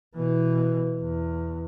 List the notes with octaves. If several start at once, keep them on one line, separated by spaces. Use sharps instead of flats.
B2 E3
E2